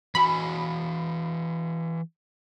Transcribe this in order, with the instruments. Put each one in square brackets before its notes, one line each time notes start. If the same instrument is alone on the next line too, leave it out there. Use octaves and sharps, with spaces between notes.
[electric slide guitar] E3 F#4 G#5 [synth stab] B5